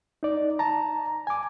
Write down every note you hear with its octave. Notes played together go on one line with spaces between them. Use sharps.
D#4 D5
A5 A#5
G#5 D6